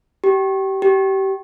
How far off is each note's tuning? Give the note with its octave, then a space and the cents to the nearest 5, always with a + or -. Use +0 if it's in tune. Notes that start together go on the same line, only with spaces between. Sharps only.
G4 -25
G4 -25